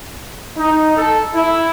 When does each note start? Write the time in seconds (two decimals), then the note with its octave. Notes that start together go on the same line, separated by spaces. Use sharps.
0.57 D#4
0.97 A4
1.34 E4